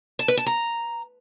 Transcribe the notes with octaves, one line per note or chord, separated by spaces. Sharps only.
A5
B4
A5
A#5